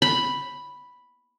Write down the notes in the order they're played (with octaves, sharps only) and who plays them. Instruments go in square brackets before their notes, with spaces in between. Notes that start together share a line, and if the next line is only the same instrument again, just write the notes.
[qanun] B5